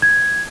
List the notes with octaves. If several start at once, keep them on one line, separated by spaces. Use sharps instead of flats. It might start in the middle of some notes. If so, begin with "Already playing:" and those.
G#6